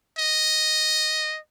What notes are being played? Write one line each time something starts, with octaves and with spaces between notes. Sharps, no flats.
D#5